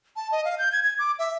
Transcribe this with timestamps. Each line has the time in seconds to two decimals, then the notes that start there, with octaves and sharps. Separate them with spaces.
0.16 A5
0.32 D#5
0.45 F5
0.58 G6
0.72 G#6
0.85 G#6
0.99 D6
1.19 E5